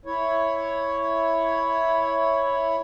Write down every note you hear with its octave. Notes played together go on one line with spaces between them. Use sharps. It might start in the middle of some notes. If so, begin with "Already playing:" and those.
E4 C#5